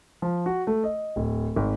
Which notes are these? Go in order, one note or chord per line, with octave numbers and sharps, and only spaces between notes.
F3
F#4
A3
D#5
D1
G#1